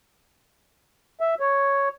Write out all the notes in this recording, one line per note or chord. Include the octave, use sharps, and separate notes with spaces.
E5
C#5